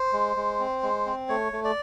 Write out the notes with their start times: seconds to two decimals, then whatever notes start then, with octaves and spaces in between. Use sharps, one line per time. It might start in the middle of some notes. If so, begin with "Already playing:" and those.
Already playing: C5
0.13 G#3
0.36 G#3
0.59 C4
0.83 G#3
1.06 C4
1.29 A3 C#5
1.52 A3
1.64 D5